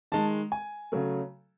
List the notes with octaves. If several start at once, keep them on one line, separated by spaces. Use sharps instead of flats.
D#3 G#3 A5
G#5
C#3 F#3 A3